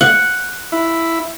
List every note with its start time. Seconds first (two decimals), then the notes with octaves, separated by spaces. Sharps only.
0.01 F#5
0.72 E4